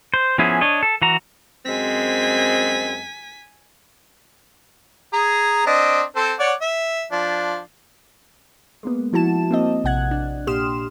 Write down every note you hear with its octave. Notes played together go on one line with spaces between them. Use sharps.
C5
F3 B3 C#4 E4 G#4
D4 C#5 D#5
A4
E3 F#4 A#5
F#2 G#3 C4 G#5 B6
G#4 A#5
C4 D4 D#5
C4 A4 C5
C#5 D5 F#5
E5
F3 D4
G#3 A#3 B3
F3 E4 F#4 A5 E7
A#3 C4 D#5
A#1 C3 F#5 F#6 G#6
D4
A#2 G4 C6 D#6 F6 E7